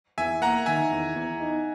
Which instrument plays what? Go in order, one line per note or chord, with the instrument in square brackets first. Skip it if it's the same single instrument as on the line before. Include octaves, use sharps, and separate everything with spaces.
[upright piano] E2 [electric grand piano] E5 G#5
[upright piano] A#3 [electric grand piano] F#5 A#5
[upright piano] D#3 [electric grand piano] E5 G#5
[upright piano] E2
E2
D#4